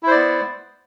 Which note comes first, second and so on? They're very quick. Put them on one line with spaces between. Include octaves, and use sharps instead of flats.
E4 C5 D5 B3